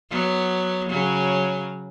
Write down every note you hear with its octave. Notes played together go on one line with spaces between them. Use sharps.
F#3 B3
C#3 F#3